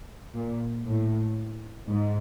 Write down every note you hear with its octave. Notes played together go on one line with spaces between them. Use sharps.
A#2
A2
G#2